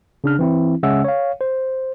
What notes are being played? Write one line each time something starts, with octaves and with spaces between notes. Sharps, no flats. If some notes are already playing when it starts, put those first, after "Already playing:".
C#3 D4 F6
E3 C4 E4
C#3 G#3 C#4 E5 F#5 E6
C#5 F5
C5